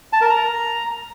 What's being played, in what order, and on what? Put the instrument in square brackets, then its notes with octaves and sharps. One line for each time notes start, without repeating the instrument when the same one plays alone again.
[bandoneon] A5
A#4
A#5